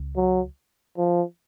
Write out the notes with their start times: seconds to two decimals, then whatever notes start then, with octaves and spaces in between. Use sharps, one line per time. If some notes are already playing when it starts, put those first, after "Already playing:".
Already playing: C#2
0.16 F#3
0.98 F3